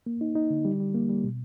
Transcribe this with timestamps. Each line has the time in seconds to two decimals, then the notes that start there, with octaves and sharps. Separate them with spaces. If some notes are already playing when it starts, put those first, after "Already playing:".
0.06 A#3
0.21 D#4
0.35 D#4
0.50 D3
0.65 G3
0.80 G3
0.95 A#3
1.09 G3
1.24 B2